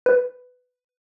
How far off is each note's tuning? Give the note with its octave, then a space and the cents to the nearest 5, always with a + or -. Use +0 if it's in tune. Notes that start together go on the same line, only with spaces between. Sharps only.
B4 +15